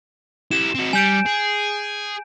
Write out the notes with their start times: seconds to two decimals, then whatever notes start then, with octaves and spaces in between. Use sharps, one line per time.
0.51 E4 G4 E7
0.75 C4 F#4
0.93 G3 G#5 G6 D7
1.26 G#4